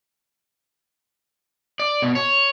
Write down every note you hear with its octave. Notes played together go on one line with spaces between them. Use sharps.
D5
B2
C#5